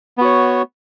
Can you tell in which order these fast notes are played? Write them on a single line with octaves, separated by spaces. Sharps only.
B3 F#4 C#5